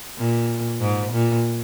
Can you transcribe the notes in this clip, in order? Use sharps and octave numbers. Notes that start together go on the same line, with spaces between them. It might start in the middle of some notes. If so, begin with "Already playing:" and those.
A#2
G#2
A#2